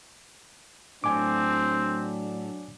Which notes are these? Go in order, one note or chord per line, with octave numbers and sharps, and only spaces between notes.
A2 F#3 A3 C4 D4 G#5 D6